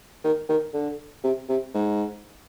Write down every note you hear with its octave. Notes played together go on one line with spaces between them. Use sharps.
D#3
D#3
D3
C3
C3
G#2